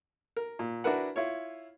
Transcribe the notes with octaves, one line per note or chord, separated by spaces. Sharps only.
A#4
A#2
D4 E4 F#4 A#4 B4 F#5
E4 F4 C#5